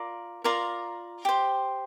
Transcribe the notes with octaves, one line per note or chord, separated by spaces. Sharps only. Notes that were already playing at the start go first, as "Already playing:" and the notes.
Already playing: F4 A#4 D5
F4 A#4 D5 A#5
G4 C5